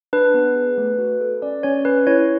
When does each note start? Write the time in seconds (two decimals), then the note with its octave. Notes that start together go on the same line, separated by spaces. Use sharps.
0.13 D4 B4
0.34 B3
0.56 G#4
0.78 A3
0.99 F#4
1.21 A4
1.42 C#4 D5
1.63 C#4 C#5
1.85 C#4 B4
2.07 E4 C#5